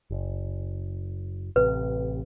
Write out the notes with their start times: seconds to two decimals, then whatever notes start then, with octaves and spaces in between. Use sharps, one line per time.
0.11 F#1
1.56 A1 C3 B4